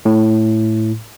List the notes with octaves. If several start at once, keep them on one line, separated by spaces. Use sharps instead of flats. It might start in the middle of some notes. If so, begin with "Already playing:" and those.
A2